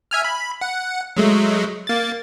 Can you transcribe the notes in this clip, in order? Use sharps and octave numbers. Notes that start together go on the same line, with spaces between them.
E5 G#5 F6
B5
F#5
F#3 G#3 A3
A#3 A6